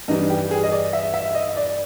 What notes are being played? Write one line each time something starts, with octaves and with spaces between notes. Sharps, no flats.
G2 E3 G3 D#4
G4
G#4
D#5
D5
E5
E5
D#5
D5